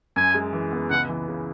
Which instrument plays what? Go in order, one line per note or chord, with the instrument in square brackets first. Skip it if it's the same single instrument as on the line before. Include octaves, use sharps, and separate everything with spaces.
[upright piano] F#2 [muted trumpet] G#5
[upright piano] G#3
E3
B3
[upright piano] C#2 [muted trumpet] F#5
[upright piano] E3
C#3